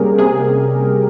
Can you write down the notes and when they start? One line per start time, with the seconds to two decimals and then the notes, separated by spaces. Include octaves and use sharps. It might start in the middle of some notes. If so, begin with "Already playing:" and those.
Already playing: C3 G3 A#3 C#4 G4 G#4 A#4
0.18 C3 G#4